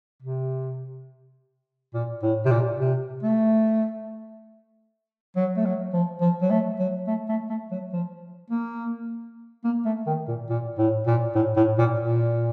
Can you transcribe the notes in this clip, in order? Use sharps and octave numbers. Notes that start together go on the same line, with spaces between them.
C3
A#2
A2
C3
A#2
C3
A3
F#3
A3
F#3
F3
F3
F#3
A3
F#3
A3
A3
A3
F#3
F3
A#3
A#3
A3
D#3
A#2
A#2
A2
A#2
A2
A2
A#2
A#2